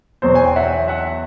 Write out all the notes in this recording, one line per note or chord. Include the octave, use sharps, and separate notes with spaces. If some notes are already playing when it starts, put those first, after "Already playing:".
E2 B2 F#3 C5
G#5
G5
E5 F#5
E5 F#5